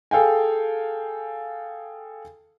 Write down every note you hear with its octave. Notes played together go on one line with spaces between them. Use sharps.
G#4 A4 F5 G5 G#5